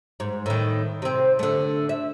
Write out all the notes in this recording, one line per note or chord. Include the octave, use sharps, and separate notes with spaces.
G#2
A2 D#3
C3 C4
D3 A3
E5